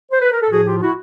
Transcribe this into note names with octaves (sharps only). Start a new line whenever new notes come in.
C5
B4
A#4
A4
A2 F3 F#4 G#4
F4 G4
E4 F#4